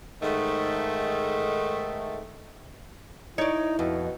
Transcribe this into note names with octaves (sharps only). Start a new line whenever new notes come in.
G#2 D#3 A3
D#4 E4 C#5 D5
F2 B2